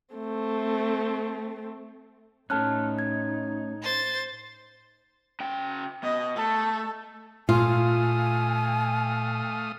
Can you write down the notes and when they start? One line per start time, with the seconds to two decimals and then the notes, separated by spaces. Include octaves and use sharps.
0.14 A3 C4
2.50 A2 A3 C#4 D#4 A5 F6 F#6
2.99 G#6
3.82 C5 A6
5.40 C#3 G5
6.03 B2 D#5
6.37 A3 A4
7.49 A#2 A3 F4 F5 G#5 D#6